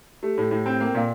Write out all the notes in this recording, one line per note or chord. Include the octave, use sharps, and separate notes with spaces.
A3 G4
A2 A4
A2
C4
A#3
G5
A#2 F5